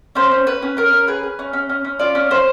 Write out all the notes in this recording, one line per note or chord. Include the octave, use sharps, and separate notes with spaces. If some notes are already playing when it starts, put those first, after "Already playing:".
C#4 C5
C#4
C#4 B4
C#4
C#4 A#4
C#4
G#4 B4
G#4
C#4
C#4
C#4
C#4
F4 D5
C#4
C#4 C5